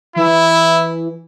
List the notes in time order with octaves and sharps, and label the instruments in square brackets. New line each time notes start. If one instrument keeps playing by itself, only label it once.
[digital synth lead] E3 [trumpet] E4